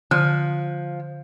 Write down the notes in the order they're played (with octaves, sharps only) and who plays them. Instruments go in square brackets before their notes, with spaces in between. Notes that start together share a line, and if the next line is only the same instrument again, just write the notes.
[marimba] D3 [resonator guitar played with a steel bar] F3